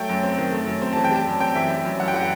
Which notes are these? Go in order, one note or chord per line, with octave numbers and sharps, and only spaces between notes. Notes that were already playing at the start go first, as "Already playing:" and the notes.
Already playing: F#3 A3 G5
F#2
C4
D#3
A3
F#2
C4
E3 A5
G5
G3 A5
F#2
C4 G5
E3 E5
G3
F#2
F#2 F#5
G5
E3 F#5